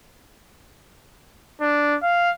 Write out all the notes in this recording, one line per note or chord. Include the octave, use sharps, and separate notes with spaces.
D4
F5